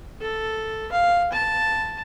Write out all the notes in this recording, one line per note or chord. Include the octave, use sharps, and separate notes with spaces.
A4
F5
A5